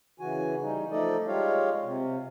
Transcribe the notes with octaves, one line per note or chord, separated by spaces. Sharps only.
C#3 E3 F#4 G#5
G3 D#4
F3 A3 D#4 A4 D5 D#5
G3 G#3 F4 G4 C#5 F5
C3